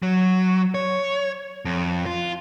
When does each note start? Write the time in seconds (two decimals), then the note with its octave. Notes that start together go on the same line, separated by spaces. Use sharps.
0.02 F#3
0.74 C#5
1.65 F2
2.06 F4